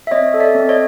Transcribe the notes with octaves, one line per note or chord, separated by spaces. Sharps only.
E5
C4 C#5 D#5
A4
D5 E5
C4
C#5 D#5